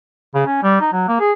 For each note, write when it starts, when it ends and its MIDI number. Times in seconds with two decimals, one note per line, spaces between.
0.35 0.43 49
0.47 0.58 61
0.63 0.78 55
0.81 0.89 63
0.93 1.07 54
1.08 1.15 58
1.20 1.32 68